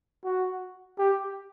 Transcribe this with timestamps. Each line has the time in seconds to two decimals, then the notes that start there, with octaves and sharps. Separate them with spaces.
0.24 F#4
0.99 G4